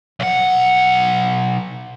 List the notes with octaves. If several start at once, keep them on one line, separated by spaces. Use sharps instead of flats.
B1 F#5